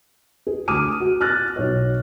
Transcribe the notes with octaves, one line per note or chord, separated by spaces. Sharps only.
G#4
D2 D6 D#6 F6 D#7
F#4
F6 F#6 A6 A#6
B1 C#5